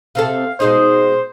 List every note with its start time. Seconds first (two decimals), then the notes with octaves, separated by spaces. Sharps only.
0.15 C3 C4 A4 F5
0.60 B2 G#3 D#4 C5